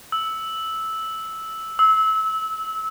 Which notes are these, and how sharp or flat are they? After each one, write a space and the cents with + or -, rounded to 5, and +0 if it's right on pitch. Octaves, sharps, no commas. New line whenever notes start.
E6 -10
E6 -25